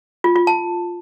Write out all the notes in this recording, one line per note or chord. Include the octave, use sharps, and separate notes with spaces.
F4
F4
A5